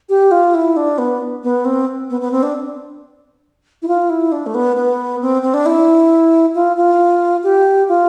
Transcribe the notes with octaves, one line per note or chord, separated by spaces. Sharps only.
G4
F4
E4
D4
B3
B3
C4
B3
B3
C4
D4
E4
F4
E4
D4
A3
B3
B3
C4
C4
D4
E4
F4
F4
G4
F4